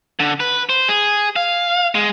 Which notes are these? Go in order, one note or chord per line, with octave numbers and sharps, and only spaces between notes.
D3
B4
C5
G#4
F5
G#3